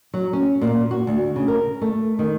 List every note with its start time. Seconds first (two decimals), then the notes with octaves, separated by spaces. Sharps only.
0.14 F#3
0.33 C#4
0.61 A#2
0.91 F#4
1.07 D2
1.36 C#3
1.48 A#4
1.81 A3
2.19 D#3